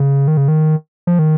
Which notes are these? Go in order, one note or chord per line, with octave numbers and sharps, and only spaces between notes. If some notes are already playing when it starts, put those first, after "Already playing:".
Already playing: C#3
D#3
C#3
D#3
F3
D#3